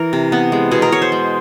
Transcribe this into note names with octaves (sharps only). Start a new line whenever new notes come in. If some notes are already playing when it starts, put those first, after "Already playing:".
Already playing: E3 A#4
C3
B3
G#3
B2 G#4
A#4
B2 C#5
C5
G#3